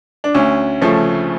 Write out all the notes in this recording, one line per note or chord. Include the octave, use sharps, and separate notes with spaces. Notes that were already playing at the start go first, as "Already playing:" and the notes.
D4
D2 C#4
C#3 F3 A3